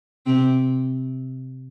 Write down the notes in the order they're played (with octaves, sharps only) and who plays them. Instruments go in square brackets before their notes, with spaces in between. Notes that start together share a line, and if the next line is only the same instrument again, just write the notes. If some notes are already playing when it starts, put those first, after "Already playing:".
[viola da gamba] C3 C4